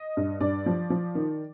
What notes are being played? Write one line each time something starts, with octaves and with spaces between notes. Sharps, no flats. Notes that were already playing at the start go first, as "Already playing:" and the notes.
Already playing: D#5
G2
G2 D5
F3
F3
D#3